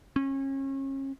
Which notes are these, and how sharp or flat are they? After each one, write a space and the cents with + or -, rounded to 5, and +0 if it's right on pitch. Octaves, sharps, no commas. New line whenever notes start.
C#4 -35